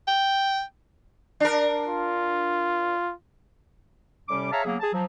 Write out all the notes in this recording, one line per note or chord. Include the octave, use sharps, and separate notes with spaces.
G5
D4 A#4
F4
A2 C3 G3 C#4 D6
G#4 C#5 E5 F5 A5 A#5
C#3 F#3 A#3 B3 G#4
G#4 A5
F3 F#3